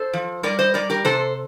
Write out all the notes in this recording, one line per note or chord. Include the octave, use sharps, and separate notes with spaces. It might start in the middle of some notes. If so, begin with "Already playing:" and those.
Already playing: A4 C5
F3
G3 A#4 D5
C5 D#5
G3 A#4 D5
G4 A#4
C3 A4 C5